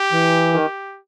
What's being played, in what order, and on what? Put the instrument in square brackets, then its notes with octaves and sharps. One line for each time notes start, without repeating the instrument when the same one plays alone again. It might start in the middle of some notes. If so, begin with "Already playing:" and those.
Already playing: [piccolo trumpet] G4
[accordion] E3
D#3